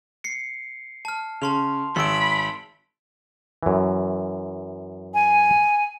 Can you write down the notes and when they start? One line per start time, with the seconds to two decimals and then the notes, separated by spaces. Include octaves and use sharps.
0.24 C7 C#7
1.05 A5 F6
1.42 C#3 A5 C6 F7
1.96 G#1 B5 C6 E6 D7
3.63 F#2 E3
5.14 G#5